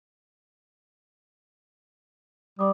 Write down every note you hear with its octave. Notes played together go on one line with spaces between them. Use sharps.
G3 D5 D6 D#6